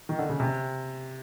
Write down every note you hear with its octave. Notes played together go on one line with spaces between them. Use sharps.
D#3
D3
C#3
C3